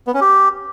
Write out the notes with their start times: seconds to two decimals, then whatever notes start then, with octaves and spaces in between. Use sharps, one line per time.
0.07 B3
0.14 C#4
0.21 G4